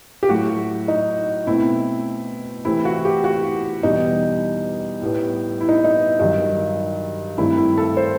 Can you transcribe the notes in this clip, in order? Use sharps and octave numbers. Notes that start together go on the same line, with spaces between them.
G4
A2 F#3 A3 F#4
D#4
B2 A3 C4 E4
C3 E3 A3 C4 E4
F#4
G4
F#4
E2 B2 G3 D#4
A2 G3 B3
E4
D#4
D#4
G2 D#3 F#3 D#4
G2 D#3 A3 C4 E4
E4
A4
C5